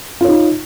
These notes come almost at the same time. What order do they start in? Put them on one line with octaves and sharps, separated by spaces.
F4 C#5 D#4